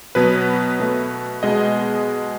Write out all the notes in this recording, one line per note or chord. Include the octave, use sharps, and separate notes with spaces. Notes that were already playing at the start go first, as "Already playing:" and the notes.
B2 F#3 B3 B4
B2 A3
B2 G#3 B3 D#5